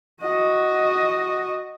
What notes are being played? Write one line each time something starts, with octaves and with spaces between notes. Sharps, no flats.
F#4 D#5